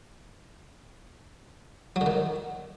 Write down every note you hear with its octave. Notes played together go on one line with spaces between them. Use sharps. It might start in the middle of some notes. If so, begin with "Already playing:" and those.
F#3
D3
D#3